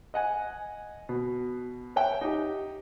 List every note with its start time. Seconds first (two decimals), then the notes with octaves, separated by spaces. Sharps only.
0.14 D#5 F#5 G#5
1.09 B2
1.96 C#5 E5 F#5 G5
2.21 D#4 G4